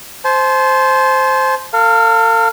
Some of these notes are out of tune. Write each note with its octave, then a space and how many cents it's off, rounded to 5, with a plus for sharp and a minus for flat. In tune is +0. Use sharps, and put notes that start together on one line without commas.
C5 +0 A5 -40
A4 +45 F5 +0